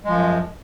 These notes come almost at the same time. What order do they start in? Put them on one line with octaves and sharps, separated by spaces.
G#3 F3 F#2